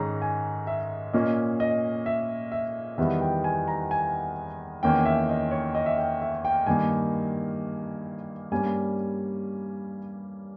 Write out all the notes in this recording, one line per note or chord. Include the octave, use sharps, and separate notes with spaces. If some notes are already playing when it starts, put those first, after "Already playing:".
Already playing: G#2 D#3 G#3 C#4 A#5
G#5
E5
A#2 A#3 C#4 D#5
D#5
E5
E5
E2 D#3 G3 B3 E5
G5
G#5
A#5
G#5
E2 D#3 A#3 C#4 G5
E5
D#5
C#5
D#5
E5
G5
E5
G5
G2 D#3 A#3 G#5
G2 G3 A#3 C#4 G#5